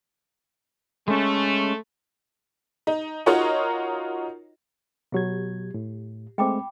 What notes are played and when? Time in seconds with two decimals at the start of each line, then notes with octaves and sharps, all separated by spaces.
1.08 G#3 A3 C#4
2.87 D#4
3.26 D#4 F4 F#4 A#4 C#5 D#5
5.12 B2 F#3 F4 G4 G#6
5.74 A2
6.38 G#3 A3 C4 G5 B5 D6